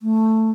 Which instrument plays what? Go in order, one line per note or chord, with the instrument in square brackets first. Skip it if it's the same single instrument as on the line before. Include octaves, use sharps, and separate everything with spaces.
[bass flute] A3